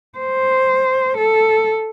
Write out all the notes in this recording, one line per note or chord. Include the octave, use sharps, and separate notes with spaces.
C5
A4